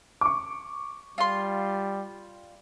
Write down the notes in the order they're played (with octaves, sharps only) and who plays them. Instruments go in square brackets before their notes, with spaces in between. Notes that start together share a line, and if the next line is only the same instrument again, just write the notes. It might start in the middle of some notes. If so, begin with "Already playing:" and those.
[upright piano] C#6 D6
[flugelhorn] G3 [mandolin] F4 C6